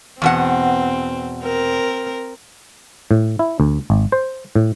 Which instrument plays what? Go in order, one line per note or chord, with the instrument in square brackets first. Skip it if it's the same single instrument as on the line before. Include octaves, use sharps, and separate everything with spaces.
[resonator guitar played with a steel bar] E2 B2 F#5 [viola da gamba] C4
[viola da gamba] C4 A#4
[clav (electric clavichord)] A2
E4
D2
G#1
C5
A2